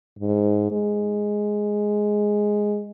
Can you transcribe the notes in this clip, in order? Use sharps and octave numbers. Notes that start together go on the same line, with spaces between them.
G#2
G#3